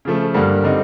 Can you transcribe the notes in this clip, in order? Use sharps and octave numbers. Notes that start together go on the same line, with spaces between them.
C#3 F3 A3
G2 D3 G3 A#3
D3 G3 C4 D#4